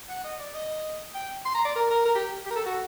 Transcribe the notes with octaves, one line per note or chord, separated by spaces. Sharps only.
F#5
D#5
D5
D#5
G5
C6
A#5
D5
A#4
A#4
A#4
G4
G4
A#4
A4
F#4